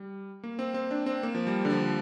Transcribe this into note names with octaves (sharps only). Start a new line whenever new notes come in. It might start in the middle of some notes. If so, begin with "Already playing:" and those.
Already playing: G3
A#3
C4
C4
D4
C4
A#3
F3
G3
D3
F3